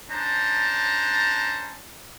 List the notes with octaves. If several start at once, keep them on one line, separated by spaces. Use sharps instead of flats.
C#4 D4 C5 A5 A#5